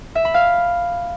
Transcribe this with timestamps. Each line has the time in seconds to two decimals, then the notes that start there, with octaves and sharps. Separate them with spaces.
0.15 E5
0.25 B5
0.34 F5